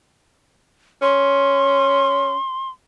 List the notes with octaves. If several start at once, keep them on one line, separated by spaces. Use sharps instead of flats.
C#4 C6